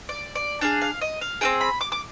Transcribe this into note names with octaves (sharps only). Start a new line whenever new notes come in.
D5
D5
D4 G#4 F5
F5
D#5
F5
C4 F4 G#4 G5
B5
D6
D6